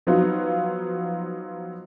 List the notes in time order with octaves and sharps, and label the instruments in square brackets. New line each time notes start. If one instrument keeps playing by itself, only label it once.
[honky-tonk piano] F3 F#3 B3 D#4 F4 F#4